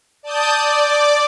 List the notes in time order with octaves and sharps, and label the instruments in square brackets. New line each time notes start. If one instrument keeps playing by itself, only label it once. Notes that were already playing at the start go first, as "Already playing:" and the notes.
[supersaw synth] D5 A5 D#6 G6
D5